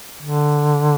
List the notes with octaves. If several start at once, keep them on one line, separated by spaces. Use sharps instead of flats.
D3